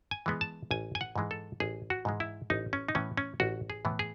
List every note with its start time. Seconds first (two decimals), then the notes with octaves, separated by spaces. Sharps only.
0.11 G#5
0.26 E3 G#3 B3
0.41 A5
0.71 A1 G#5
0.95 G#5
1.01 F#5
1.16 G#2 E3 G#3
1.31 A4
1.60 A1 G#4
1.90 F#4
2.05 G#2 E3 G#3
2.20 E4
2.50 A1 D#4
2.73 C#4
2.89 D#4
2.95 A2 E3 B3 C#4
3.17 C#4
3.40 A1 F#4
3.70 G#4
3.85 A2 E3 B3
3.99 G#4